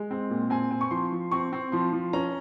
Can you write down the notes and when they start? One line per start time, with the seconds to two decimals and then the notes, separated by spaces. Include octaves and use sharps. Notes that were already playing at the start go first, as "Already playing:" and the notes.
Already playing: G#3
0.11 C4
0.30 A#2
0.50 C4 G#5
0.71 C4
0.81 C#6
0.91 F3 C6
1.12 F3
1.31 C4 C#6
1.53 C4
1.72 F3 C6
1.93 F3
2.13 C#4 A#5